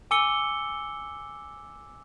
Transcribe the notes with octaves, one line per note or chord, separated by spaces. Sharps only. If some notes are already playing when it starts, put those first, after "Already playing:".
G#5 D6 E6 C#7 G7